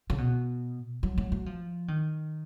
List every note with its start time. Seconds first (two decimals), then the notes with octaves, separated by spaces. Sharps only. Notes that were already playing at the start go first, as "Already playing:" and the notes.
0.10 C#3
0.18 B2
1.03 F#3
1.18 F#3
1.32 F#3
1.46 F3
1.88 D#3